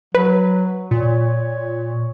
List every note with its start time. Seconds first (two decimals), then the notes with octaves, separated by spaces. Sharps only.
0.15 F#3 B4
0.91 A#2 C#5